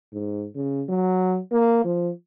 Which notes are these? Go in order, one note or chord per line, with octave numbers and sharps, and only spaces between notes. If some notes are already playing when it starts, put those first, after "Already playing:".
G#2
C#3
F#3
A#3
F3